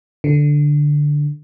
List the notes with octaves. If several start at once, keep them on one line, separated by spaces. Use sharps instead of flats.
D3